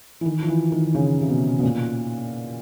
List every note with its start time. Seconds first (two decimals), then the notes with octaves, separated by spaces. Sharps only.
0.21 E3
0.26 D#3
0.42 F3
0.48 E3
0.72 D#3
0.95 C#3
1.22 C3
1.29 B2
1.59 B2
1.63 A#2